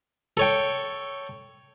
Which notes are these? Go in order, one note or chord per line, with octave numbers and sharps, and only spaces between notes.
A4 C#5 G5